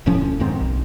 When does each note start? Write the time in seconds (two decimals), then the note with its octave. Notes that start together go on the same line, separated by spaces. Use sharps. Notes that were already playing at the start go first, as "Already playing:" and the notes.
0.06 D1 A2 F3 C#4
0.40 E1 G#2 D#3 C4
0.60 B1